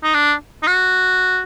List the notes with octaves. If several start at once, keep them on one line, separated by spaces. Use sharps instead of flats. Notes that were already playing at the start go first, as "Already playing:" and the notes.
D#4
D4
D#4
F#4